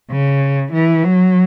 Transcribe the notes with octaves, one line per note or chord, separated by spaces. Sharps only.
C#3
E3
F#3